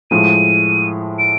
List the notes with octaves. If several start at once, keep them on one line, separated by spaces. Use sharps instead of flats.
A2 F3 G#3 D#7
D7